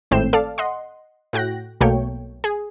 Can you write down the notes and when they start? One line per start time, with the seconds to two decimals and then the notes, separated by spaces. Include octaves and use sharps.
0.11 G#1 A2 C4 G6 C7 E7
0.33 A4 D5 F5 A5
0.58 D#5 F#5 C6
1.33 A2 F#4 G5 F#6 A#6
1.81 B1 B2 A3 A#3 C#5 G5
2.44 G#4